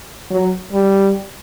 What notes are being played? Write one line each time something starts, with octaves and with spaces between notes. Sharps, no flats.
F#3
G3